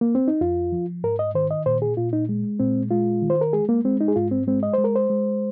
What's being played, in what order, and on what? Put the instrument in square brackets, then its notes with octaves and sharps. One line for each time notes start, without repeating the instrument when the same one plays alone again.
[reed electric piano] A#3
C4
D#4
F2 F4
F3
G#2 A#4
D#5
D#3 C5
D#5
A#2 C5
G#4
A#2 F4
D#4
G#3
A#2 C4
G#3 F4
D#3
C5
A#4
G#3 G#4
A#3
G#3 C4
D#4
G#4
G#2 F4
C4
G#3 C4
D#5
G#3 C5
A#4
C5
G#3